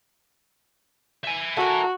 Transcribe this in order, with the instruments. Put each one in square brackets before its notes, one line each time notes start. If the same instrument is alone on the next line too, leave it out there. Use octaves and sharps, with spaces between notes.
[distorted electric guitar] E5 G#5
[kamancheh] F#4 [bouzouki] A4 A#4